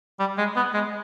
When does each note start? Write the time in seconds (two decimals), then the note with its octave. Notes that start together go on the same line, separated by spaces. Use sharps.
0.19 G3
0.38 G#3
0.56 B3
0.74 G#3